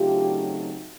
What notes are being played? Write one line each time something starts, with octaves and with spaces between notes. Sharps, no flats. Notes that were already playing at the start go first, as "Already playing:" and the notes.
Already playing: C#3 F#3 A3 C4 D#4 F4 G4